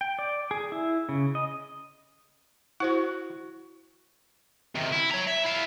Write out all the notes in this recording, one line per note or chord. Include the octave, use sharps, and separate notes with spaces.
G5
D5
G#4
E4
C#3
D#5
E4 F#4 C5 F#5
C3 D#3
E4
C#5 A#5
E5
E4 F5